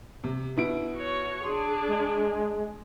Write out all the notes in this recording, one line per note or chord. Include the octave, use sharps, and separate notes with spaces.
C3
B2 E4 D7
F#4 C#5
D4 G#4 C6
G#3